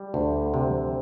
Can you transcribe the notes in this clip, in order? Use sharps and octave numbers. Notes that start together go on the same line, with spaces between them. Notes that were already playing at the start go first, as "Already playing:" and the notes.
Already playing: G3
D2
C3